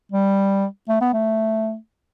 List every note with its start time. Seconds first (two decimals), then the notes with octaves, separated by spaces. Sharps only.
0.12 G3
0.89 A3
1.01 B3
1.13 A3